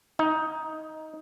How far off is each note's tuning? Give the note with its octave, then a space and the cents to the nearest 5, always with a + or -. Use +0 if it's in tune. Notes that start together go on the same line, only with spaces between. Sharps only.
D#4 +15